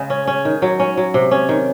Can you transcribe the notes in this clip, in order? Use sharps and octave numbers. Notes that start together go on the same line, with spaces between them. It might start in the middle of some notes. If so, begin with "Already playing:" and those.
Already playing: C#3 G#3
C#4
C#4
D#3
F#3
C#4
F#3
C3
C#4
D#3